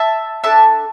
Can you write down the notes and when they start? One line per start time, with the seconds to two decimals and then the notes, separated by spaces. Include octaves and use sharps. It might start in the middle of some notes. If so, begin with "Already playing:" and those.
Already playing: E5 A5
0.44 D4 A4 E5 A5